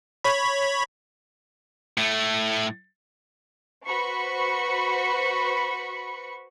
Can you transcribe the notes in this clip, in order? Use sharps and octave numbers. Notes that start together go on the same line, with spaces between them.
C#5 B5
A2 A3
F#4 B4 C5 B5 C#6 C#7